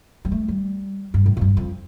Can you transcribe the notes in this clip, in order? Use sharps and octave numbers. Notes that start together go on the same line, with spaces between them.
G3
A3
G3
G2
A2
F2
G2
F2